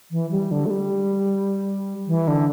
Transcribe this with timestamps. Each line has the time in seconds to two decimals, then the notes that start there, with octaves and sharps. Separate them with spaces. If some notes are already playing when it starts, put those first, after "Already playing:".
0.11 E3
0.31 G3
0.51 D3
0.66 A3
0.70 G3
2.07 E3
2.28 D3